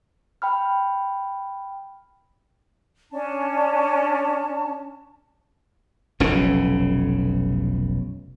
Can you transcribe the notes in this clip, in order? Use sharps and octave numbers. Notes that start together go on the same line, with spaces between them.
G5 B5 F6
C#4 D4 A5
F1 B1 C#3 C#4